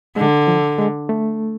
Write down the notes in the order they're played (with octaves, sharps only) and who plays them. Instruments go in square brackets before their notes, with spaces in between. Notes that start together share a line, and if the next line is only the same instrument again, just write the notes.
[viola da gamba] D3 [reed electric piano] G#3
[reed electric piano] F3
G#3
A3